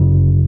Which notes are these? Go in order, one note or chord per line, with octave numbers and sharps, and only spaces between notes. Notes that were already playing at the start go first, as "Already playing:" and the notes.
Already playing: G1 F#2 C#3